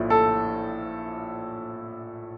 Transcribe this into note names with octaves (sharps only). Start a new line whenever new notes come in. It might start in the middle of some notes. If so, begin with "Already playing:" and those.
Already playing: A#1 A2 F3
A4